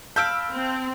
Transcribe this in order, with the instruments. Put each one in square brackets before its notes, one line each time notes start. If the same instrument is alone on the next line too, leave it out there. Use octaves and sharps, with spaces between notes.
[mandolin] F5 B5 [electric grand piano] A5 E6 D7 [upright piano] G6
[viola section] C4